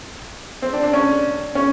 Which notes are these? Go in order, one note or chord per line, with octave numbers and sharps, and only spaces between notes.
C4
D4
D4
C#4
C#4